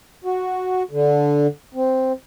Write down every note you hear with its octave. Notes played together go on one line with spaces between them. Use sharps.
F#4
D3
C4